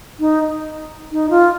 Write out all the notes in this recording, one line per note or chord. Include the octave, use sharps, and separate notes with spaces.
D#4
D#4
F4